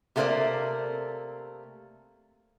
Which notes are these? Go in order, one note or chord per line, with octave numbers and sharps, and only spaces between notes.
C3 A3 A#3 D4 C5 D5